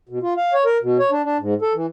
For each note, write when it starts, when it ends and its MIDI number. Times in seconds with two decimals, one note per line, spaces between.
0.09 0.19 47
0.23 0.34 65
0.37 0.53 77
0.54 0.64 73
0.65 0.78 70
0.83 0.98 47
0.99 1.10 73
1.11 1.23 62
1.24 1.37 62
1.40 1.54 44
1.62 1.73 69
1.74 1.86 52